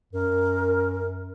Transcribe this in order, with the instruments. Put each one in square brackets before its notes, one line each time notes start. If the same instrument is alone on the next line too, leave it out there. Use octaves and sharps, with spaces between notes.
[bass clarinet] F#2 [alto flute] A#4